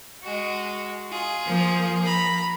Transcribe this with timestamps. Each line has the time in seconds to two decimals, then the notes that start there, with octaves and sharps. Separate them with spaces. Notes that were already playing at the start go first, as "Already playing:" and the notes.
0.23 G#3 F#4
1.10 F4 G#4
1.46 F3 A#3
2.05 A#5 B5